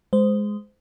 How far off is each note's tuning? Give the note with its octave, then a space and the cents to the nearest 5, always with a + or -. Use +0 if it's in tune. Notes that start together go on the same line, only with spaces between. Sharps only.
G#3 +0 C5 -20